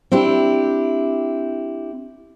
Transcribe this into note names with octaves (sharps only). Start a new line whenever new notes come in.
C4 D4 E4 G4